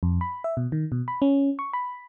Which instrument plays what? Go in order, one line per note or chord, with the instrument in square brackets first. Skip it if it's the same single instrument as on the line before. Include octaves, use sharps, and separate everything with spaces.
[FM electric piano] F2
B5
E5
B2
D#3
B2
B5
C#4
C#6
B5